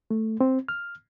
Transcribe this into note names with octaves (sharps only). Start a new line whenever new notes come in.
A3
C4
F6